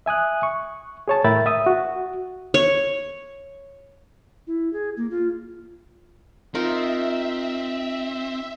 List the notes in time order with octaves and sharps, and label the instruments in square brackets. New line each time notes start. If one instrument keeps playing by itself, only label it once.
[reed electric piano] E5 G#5 D#6 F#6
C#6
G#4 C#5 A5
A2 A#4 E5 G5 B5 A6
E5 D#6
F#4
[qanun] C#5
[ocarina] E4
G#4
A#3
F4
[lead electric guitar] C4 [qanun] D#4 F4 A#4 [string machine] E5